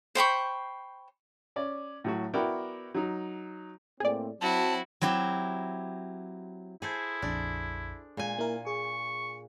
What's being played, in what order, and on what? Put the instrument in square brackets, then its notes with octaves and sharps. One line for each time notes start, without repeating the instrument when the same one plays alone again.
[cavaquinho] C5 G5 B5 C#6
[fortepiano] C#4 D5
A2 F#3 F#4
B3 E4 F#4 A#4 D5 G5
F#3 D#4
[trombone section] A2 A#3 C4 [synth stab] G#4 D5
[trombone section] F#3 C4 [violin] E4 F#4 [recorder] A5
[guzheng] F#3 C4 E4 G4
[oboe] E4 [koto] G#4 A4 C5
[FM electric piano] A#1 F2 [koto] D4
[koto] A#2 G#5 [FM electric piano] G#3
[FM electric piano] A#3 E4 A#4
[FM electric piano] G#4 [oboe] C#6